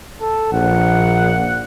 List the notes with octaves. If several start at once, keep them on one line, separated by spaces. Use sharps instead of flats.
A4
A#1 F#5